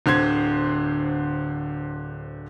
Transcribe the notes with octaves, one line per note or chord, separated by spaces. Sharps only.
D1 D3 C5 G#6